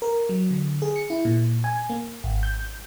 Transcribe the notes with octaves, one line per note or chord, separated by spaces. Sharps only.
A#4
F#3
D3
G#4
C#7
E4
A#2
G#5
A#3
G#1
G6